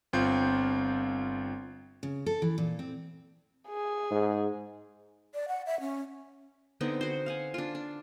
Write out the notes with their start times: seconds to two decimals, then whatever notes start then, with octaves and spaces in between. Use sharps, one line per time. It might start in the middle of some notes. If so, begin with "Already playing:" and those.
0.13 G1 C4 F4 G6
2.03 C#3
2.26 A4
2.42 E3
2.58 A#2
2.79 C4
3.68 G#4
4.11 G#2
5.34 D5
5.48 F#5
5.66 E5
5.80 C#4
6.81 D3 B3 C4 D#4
7.01 F#4 C5
7.26 F5 F#5 G#5
7.54 D4 F4
7.75 D4